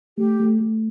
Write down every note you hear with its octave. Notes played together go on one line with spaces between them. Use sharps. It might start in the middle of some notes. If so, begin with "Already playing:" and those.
A3 G4
A3
A3